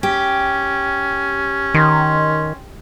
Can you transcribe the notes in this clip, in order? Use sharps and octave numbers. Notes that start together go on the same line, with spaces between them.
C#4 G4
D#3 C6